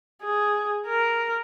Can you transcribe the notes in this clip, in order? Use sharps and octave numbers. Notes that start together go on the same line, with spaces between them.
G#4
A#4